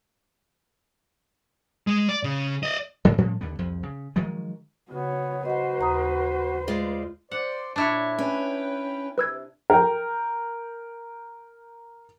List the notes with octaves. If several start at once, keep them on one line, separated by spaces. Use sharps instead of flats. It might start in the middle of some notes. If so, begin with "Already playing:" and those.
G#3
D5
C#3
D5 D#5
D2 G#2 C#3
A2 F3 G3 C#4
D#2 D3 B3
C2 F2 F3
C#3
D#3 F3 F#3 G#3
C#3 B3 F#4 C#5
F#4 B4 C5 D#5 F#5
D#2 A#5 D#6
G#3 F4 D5
C5 D5 F#5
A#2 D4 E4 C#5
C#4 B4 G5
C3 B4 E6 G#6
A#4 G5